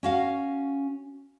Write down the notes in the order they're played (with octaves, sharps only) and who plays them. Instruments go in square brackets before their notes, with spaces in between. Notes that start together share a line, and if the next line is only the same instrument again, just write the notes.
[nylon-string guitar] C#4 F#4 F5